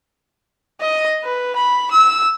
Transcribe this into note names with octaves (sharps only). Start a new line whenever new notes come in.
D#5
B4
B5
E6